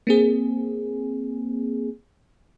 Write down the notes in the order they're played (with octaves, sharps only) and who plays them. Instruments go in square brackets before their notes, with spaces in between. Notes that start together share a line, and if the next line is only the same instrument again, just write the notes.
[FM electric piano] A#3 C4 G#4